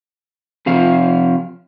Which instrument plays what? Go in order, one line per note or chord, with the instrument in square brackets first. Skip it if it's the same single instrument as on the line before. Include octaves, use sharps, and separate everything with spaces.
[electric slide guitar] C3 F3 F4